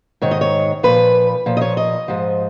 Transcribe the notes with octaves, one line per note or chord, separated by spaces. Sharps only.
G#2 D#3 C#5
D#5
C#5
A#2 F3 B4
A#2 F3
D#5
C#5
D#5
G#2 F3